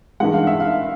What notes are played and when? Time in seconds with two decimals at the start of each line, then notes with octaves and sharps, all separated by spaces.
0.20 G2 E3 G#3 F#5
0.33 F5
0.47 E5
0.60 F5